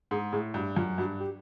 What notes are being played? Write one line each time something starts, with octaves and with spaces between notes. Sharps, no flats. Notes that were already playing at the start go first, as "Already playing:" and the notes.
G#2 G#4
A2 G#4
G2 F#4
F#2 F4
G2 F#4
G4